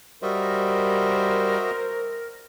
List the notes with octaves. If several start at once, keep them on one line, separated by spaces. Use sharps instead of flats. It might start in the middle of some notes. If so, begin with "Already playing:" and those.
G3 F#4 A#4 C5 D#5 E5